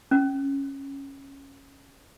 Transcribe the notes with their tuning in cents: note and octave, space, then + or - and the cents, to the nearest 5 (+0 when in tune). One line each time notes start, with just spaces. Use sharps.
C#4 -10